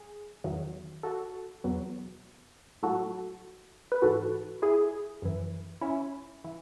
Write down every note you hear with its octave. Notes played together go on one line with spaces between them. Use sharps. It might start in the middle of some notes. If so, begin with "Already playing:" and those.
Already playing: G#4
E2 D#3 F#3
F#4 A4
E2 B2 F#3
A2 F#3 F#4 A4
B4
G#2 E3 F#4 A4
E4 G#4
F#2 E3
C#4 E4
E3